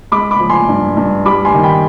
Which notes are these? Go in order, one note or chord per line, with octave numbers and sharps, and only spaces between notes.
G#3 B5 D6
B5 D6
F3
G#5 C6
G2
G2
G3 B5 D6
G#5 C6
D#3
G5 B5